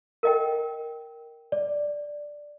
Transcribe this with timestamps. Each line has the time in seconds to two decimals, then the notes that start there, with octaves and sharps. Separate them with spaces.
0.23 A#4 D#5 G5
1.52 D5